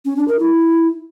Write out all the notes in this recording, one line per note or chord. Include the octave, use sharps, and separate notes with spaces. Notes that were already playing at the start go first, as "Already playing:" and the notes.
C#4
D4
A#4
E4